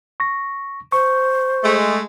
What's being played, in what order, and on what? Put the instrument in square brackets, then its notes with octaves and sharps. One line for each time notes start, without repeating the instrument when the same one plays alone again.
[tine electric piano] C#6 A#6
[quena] C5 [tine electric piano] C#6
[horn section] G#3 A3